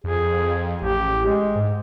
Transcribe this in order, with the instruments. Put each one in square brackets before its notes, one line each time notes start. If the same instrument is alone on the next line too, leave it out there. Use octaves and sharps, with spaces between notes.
[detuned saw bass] F2 [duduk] G#4
[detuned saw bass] A1 [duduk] G4
[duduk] G#3
[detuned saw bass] G#2